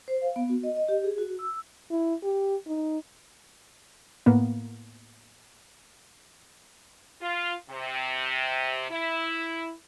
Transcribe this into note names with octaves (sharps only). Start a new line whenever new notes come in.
C5
F5
B3
F#4
D#5
D#5
G4
G#4
F#4
E6
E4
G4
D#4
A2 A#3 B3
F4
C3
E4